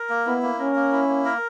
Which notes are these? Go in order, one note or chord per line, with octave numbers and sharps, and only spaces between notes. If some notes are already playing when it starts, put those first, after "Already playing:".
Already playing: A#4
A#3
B3 E4
A#3
C#4 A#4
A#3
E4
A#3
A#4